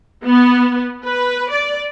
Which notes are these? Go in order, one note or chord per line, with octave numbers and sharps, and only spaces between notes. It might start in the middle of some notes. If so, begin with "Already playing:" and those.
B3
B4
D5